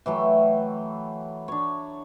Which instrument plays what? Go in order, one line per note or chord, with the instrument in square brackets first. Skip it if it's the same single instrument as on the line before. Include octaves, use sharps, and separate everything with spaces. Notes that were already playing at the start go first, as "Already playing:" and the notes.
[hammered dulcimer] E3 F#3 A3 G5
D4 C#5